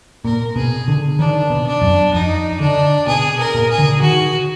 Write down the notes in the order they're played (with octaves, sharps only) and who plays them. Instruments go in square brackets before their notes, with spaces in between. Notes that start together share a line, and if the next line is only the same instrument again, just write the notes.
[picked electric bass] A#2 [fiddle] A#4
[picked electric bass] B2 [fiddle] G#4
[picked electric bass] D3
[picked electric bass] D#3 [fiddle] D4
[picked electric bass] B2
[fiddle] D4
[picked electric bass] F#2
[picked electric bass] F2 [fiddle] D#4
[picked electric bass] D3 [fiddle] D4
[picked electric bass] B2 [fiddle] G#4
[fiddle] A#4
[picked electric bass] A#2
[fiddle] G#4
[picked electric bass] D3
[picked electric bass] D#3 [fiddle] F#4